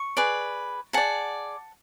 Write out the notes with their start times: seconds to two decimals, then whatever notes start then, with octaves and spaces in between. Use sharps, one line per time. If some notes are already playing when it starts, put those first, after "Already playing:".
Already playing: C#6
0.17 G#4 B4 D5
0.93 G#4 D5 F#5 A5